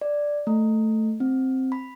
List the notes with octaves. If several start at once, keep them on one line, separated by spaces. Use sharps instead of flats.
D5
A3
C4
B5